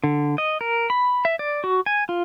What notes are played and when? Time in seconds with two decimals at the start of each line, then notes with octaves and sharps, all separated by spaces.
0.04 D3
0.38 D#5
0.61 A#4
0.90 B5
1.25 E5
1.39 D5
1.64 F#4
1.86 G#5
2.09 F4